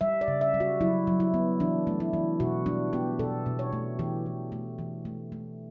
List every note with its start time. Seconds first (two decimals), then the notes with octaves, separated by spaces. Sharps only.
0.01 G3 E5
0.21 D5
0.28 C#3
0.41 E5
0.54 G3
0.60 F#4
0.81 F#3 E4
1.07 F#3
1.20 E4
1.34 B3
1.60 E3 D4
1.87 A3
2.00 E4
2.13 E3
2.40 B2 F#4
2.66 G3 D4
2.93 B3 G4
3.19 B2 A4
3.46 B2
3.59 C#5
3.73 A3
3.99 E3 G4
4.26 E3
4.52 A3
4.79 E3
5.05 A3
5.32 A3